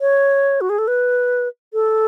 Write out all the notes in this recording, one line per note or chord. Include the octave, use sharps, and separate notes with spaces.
C#5
F#4
G#4
A4
B4
A4